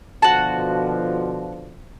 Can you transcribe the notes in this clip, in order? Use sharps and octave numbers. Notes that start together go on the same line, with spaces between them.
B2 D3 F3 F#4 A5